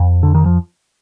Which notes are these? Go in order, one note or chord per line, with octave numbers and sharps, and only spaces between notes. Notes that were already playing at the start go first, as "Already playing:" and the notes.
Already playing: F2
D3
D#3
F3